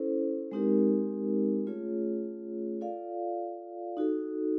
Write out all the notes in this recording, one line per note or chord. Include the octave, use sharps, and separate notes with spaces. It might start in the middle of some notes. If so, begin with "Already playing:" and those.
Already playing: C#4 E4 A4 C5
G#3 C4 D#4 G4 A#4
A3 C#4 F4 G#4 C#5
F4 A4 D5 F5
D#4 F#4 A4